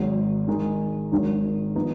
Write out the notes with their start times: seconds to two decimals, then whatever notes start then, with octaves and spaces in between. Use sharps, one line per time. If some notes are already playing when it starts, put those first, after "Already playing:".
Already playing: G#1 G#2 F#3
0.47 D#3 G#3 D#4 G#4
1.12 G#1 G#2 D#3 F#3
1.75 F3 B3 D#4